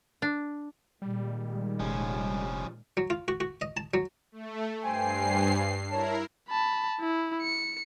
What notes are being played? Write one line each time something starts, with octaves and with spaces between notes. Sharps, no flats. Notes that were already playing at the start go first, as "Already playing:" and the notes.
D4
A#2 D#3 G3 G#3
F1 F3 C#4
F#3
F4
F#4
F#4
D#5
A5
F#3
A3
G2 C5 G5 G#5 C7
E4 A#4 C#5 A5
A5 B5
E4
C#7